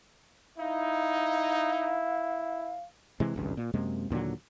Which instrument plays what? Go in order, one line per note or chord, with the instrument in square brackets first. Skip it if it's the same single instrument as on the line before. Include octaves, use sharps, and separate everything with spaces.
[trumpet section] D#4 [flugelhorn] E4 [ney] F5
[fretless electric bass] C3 E3 G#3
G#1 C#2 G2
A#2
F#2 C3 G#3 A#3
D#2 A#2 D3 F#3